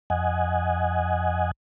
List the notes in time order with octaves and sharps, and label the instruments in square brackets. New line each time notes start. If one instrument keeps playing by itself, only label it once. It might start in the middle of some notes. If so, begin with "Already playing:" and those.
[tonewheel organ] F2 D#5 F#5 G#5